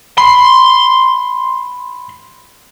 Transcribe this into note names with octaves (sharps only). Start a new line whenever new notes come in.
B5 C6